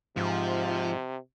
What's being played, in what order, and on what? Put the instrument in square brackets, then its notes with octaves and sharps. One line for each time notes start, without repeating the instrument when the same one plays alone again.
[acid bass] G#2 [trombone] C3 [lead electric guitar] F3